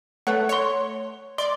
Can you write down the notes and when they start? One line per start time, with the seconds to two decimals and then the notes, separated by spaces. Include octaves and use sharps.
0.27 A3 B4 C#5 F#5
0.49 C#5 C6 C#7
1.38 D5 C6